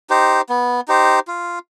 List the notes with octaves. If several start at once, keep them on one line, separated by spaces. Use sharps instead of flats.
D#4 G4 C5
B3
D#4 G4 C5
F4